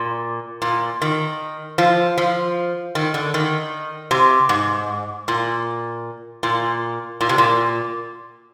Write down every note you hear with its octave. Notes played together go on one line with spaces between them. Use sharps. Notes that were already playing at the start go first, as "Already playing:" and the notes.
Already playing: A#2
A#2
D#3
F3
F3
D#3
D3
D#3
C3
G#2
A#2
A#2
A#2
C3
A#2